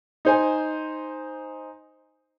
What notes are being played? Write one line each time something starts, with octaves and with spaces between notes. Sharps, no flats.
D#4 C5 G#5